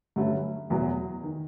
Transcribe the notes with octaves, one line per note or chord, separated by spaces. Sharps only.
G2 D3 F#3 A3 C#4
F#1 E2 B2 F#3
D#3